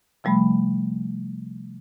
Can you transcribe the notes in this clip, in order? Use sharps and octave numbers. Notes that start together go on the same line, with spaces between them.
C3 F3 G3 A3 B5